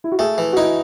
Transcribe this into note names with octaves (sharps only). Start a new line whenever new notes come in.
E4
F#4
A3 G#4
E3
F#4
D#4 E4